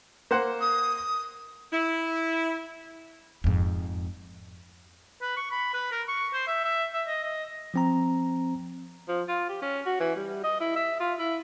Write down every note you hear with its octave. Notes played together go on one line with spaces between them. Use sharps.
A#3 C5 F#5
D#6
E4
F2 G#2
B4
C#6
B5
B4
A#4
C#6
C5
E5
E5
E5
D#5
D#5
F3 C4 A#5
F3
F4
G4
C#4
F#4
E3
G3
D#5
E4
E5
F4
E4